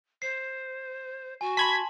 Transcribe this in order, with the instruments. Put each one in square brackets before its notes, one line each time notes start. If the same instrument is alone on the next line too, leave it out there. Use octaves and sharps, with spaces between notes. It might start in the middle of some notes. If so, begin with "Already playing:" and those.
[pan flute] C5 [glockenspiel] C7
[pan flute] F#4 [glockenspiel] G#5
[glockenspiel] A5 C6 F#7 [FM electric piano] B5 G#6 B6